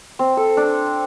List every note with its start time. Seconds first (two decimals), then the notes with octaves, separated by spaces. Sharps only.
0.19 C4
0.37 A4
0.57 D4